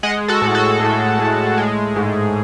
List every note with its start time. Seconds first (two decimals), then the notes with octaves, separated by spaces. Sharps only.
0.03 G#3 D#5 F#5
0.28 F#4 A4
0.42 A2
0.55 F#4 A4
0.80 A2
1.19 A2
1.58 G#3
1.96 G#2